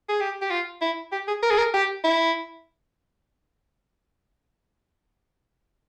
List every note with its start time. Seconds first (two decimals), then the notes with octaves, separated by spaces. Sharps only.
0.09 G#4
0.21 G4
0.42 G4
0.51 F4
0.82 E4
1.12 G4
1.28 G#4
1.43 A#4
1.51 G#4
1.58 A#4
1.74 G4
2.04 E4